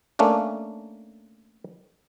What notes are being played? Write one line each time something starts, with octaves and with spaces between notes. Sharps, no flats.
A3 A#3 C#4 D4